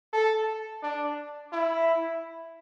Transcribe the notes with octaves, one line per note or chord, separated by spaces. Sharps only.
A4
D4
E4